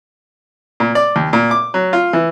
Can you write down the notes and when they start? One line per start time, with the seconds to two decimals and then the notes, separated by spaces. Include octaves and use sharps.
0.80 A#2
0.95 D5
1.16 D#2
1.33 A#2
1.51 D6
1.74 F#3
1.93 F4
2.13 E3